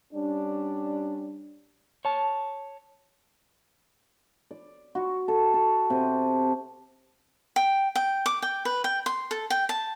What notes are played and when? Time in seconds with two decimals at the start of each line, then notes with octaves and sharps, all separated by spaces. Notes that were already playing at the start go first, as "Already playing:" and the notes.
0.13 G3 C#4 D4
2.05 C#5 A5
4.51 D5
4.95 F#4
5.28 A4
5.54 A4
5.90 C3
7.56 G5
7.95 G5
8.26 D6
8.42 G5
8.65 B4
8.84 G5
9.06 C6
9.31 A4
9.50 G5
9.69 A5